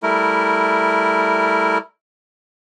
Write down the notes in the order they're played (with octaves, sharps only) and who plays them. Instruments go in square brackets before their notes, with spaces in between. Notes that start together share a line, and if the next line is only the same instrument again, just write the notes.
[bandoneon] G3 A3 E4 A#4